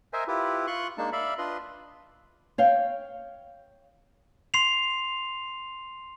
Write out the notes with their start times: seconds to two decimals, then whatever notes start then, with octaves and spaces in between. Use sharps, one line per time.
0.13 A#4 C5 D#5 E5 G#5
0.28 E4 F4 G4 B4
0.67 F4 C6 C#6 F#6
0.98 G#3 A#3 D4 D#4 A5
1.12 D5 E5 F5 B5
1.38 D4 F4 B4 D#5 C6
2.58 C#5 F5 G5
4.54 C6 C7 F7